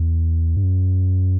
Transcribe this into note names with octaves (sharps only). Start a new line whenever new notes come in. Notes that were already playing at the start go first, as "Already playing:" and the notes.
Already playing: E2
G2
F#2